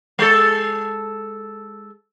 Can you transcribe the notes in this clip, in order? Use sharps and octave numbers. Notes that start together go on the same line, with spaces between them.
G#3 A4